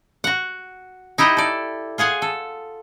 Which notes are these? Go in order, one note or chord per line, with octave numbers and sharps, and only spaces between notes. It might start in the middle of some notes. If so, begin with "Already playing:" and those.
F#4 F#5
D#4 E4 G4 D#5
A4 D5
F4 G#4 F#5 G#5
A4